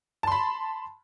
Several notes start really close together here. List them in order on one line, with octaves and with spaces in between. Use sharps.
A5 C6 B5